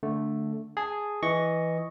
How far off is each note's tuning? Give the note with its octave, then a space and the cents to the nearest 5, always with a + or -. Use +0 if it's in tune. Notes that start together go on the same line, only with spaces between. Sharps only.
D3 -5 A3 +0
G#4 +0 A5 +0
E3 +0 D#5 +0 C#6 +0